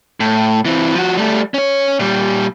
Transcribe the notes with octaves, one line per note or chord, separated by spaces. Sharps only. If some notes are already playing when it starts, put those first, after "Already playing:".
A2
E3 C4
F3 F#4
G3 A3
C#4 C#5
A#2 G3